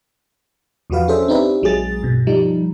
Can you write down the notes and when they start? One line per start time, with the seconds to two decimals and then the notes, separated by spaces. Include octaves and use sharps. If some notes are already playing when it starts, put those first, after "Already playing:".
0.90 E2 E3 F3 F#4 B4 F5
1.08 C#4 D4 G#4 A4 C5 E5
1.28 C4 D4 D#4 G4 B4 E5
1.62 A#1 F#3 G#3 G#4 A6
2.02 G2 B2
2.27 F3 G3 D#4